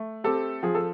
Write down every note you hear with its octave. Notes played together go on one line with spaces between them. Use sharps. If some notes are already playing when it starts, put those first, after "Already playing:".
Already playing: A3
C4 G4 A4
F3 G#4
A4